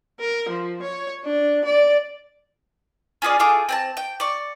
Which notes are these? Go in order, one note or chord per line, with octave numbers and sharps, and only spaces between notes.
A#4
F3
C#5
D4
D5
C#4 F4 G#4 D5
A3 F4 G#4 D6
C4 G#5 A5
G5
D5 C#6